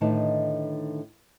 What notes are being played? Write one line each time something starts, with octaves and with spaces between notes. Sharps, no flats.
A2 D3 D#3 D#4 B4 A5